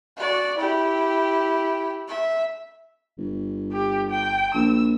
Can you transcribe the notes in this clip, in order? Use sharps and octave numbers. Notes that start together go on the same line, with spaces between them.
F#4 D5
E4 G4
E5
G1
G4
G5
A#1 E6